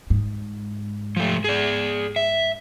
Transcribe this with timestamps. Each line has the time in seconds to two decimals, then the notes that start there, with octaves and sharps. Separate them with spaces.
0.10 G#2
1.17 F3 A3
1.44 G#4 D5
2.16 E5